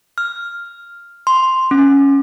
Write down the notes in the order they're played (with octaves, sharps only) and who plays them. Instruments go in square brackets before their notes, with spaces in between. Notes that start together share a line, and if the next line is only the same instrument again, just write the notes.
[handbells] F6
C6
C#4